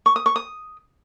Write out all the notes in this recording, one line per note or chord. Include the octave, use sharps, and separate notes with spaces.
C#6
D#6
C#6
D#6